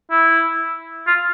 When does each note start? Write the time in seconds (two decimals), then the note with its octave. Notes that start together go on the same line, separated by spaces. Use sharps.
0.11 E4
1.07 F4